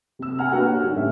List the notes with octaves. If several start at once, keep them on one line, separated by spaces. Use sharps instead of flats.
C3 E6
F#5 G#5 A#5 F6
A#3 D4 F#4 G4 B4 F#5
C#5
D3 G3 D#4
A2 C#3 C#4 E5